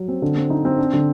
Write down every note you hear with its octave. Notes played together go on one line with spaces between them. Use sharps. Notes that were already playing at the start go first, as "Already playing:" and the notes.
Already playing: F#3
C4
D3
C4
D#4
C4
D4
D3